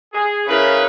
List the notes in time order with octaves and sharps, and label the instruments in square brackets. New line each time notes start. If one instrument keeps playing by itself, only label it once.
[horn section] G#4
[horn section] C#3 A#4 B4 [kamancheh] E4 C#5